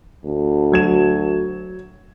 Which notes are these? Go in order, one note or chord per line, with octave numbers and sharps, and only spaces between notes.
D2
F#3 G#6 E7